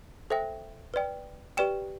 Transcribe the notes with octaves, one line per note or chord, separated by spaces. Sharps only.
A4 C5 E5 G5
B4 D5 G5
G4 B4 D5 G5 E7